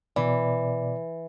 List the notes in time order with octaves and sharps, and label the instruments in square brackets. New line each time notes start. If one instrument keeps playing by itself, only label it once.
[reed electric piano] B2 D5 [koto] E3